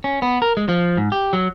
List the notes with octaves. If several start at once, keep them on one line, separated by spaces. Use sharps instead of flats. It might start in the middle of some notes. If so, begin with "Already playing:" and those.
C#4
B3
A#4
G#3
F3
G#2
G4
F#3